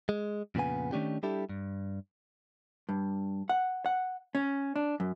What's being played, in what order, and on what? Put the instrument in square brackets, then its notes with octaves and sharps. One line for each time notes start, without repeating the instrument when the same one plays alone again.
[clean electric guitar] G#3
F2 A#2 C#3 B3 G#5
D#3 A3 C#4 D4 G4
G3 D4 E4 G4 A4
G2
[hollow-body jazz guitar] G2
F#5
F#5
C#4
D4
F#2